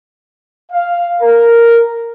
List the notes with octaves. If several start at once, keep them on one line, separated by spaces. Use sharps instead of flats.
F5
A#4